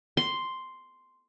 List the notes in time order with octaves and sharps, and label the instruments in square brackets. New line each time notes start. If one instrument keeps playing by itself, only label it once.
[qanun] C6